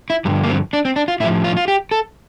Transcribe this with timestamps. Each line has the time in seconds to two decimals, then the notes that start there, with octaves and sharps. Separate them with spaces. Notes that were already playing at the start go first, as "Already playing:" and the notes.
0.10 E4
0.25 G2 D3 F3 G3
0.43 A#3
0.49 C4
0.73 D4
0.85 C4
0.96 D4
1.08 F4
1.20 A2 E4
1.24 F3
1.44 F4
1.57 F4
1.68 G4
1.91 A4